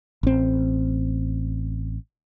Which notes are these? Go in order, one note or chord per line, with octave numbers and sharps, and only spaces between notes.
A1 C4